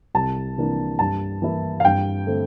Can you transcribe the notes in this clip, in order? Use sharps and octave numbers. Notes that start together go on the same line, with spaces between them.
C2 A5
C3 E3 A#3 D4
G2 A5
E3 A#3 E4
F5
G2 G5
D3 A3 C4